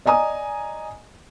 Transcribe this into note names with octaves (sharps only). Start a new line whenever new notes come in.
D5 D#5 G#5 A#5 D#6